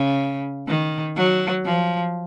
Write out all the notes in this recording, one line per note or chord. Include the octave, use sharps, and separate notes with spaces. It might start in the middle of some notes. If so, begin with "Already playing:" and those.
Already playing: C#3
D#3
F#3
F3